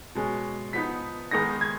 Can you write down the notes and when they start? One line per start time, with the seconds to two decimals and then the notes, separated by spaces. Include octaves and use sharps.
0.15 B2 G#3 C#4
0.73 F3 B3 D#4 B6
1.31 D#3 G#3 B3 D#4 A#6
1.61 G#6